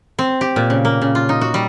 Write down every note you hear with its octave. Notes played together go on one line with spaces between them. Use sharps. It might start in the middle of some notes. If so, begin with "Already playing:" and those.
C4
G4
A#2
C#3
A#3
C#3
F4
D#4
F#4
G3